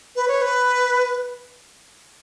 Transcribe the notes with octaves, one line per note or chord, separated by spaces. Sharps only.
B4
C#5
B4